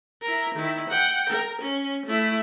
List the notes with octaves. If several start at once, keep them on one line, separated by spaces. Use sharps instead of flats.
E4 A#4
D#3 E4
F#5 G5
A#4
C#4
A3 E4